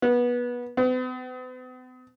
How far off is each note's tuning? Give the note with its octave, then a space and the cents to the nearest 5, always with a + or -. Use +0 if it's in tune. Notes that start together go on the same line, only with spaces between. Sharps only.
B3 -20
B3 +45